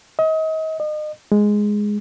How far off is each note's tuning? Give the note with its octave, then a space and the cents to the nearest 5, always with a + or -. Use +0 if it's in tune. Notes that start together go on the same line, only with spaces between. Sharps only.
D#5 +35
D#5 -35
G#3 +0